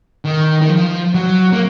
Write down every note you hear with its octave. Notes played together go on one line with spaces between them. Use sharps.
D#3
D#3
F3
F#3
A#3